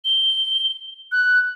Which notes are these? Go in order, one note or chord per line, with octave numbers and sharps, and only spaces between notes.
G7
F#6